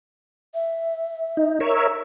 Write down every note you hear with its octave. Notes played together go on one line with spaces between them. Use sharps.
E5
D#4
A#4 C#5 E5